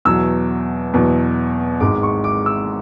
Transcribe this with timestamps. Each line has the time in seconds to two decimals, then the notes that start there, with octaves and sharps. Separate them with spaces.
0.05 E2 B2 F#3 E6
0.93 E2 B2 F#3
1.80 G#1 G#2 G#3 D6
2.03 C#6
2.24 D6
2.46 E6